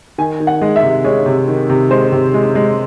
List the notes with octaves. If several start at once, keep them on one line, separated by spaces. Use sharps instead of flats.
D#3 G#5
D#3
F#5
G#3
E5
C3
G#3 C#5
C3
D#3
C3
G#3 C5
C3
G#3
G#3